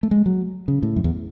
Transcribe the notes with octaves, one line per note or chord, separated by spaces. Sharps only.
A3
G#3
F#3
C#3
A2
F#2
E2